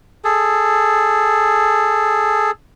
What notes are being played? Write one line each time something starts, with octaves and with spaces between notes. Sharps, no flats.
G#4 A4